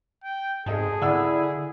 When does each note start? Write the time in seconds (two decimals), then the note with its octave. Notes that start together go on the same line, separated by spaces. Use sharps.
0.24 G5
0.66 G#2 G#4 A4 D#5 A5
1.01 D3 E4 D5 F#5 E6